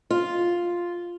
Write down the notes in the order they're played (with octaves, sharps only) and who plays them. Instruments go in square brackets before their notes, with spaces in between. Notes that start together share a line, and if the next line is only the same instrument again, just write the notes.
[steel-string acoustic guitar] F4